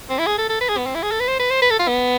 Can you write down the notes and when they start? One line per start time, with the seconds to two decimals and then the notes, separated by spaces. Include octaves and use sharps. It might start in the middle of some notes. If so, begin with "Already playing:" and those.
0.10 C4
0.18 E4
0.26 G#4
0.38 A4
0.49 A4
0.61 B4
0.69 G#4
0.78 B3
0.86 C4
0.95 E4
1.03 G#4
1.11 A4
1.20 B4
1.28 C5
1.40 B4
1.51 C5
1.62 B4
1.71 A4
1.80 F4
1.88 B3